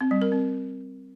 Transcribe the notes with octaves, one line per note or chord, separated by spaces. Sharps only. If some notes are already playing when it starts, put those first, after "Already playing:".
C4
G3
A#4
C4